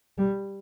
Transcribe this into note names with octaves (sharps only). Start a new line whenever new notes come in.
G3